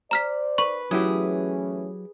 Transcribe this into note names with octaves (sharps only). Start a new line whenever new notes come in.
C5 D5 A#5 F6 B6
B4 C#6
E3 F#3 A3 C#4 E4 G4 G#4